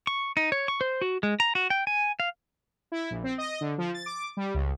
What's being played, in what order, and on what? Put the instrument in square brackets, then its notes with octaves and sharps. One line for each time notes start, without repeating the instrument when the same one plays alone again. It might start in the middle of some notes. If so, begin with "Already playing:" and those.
[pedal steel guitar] C#6
D#4
C#5
C#6
C5
F#4
G#3
A#5
F#4
G5
G#5
F5
[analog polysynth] E4
A#1
C4
D#5
D3
F3
A6
D6
G3
C#2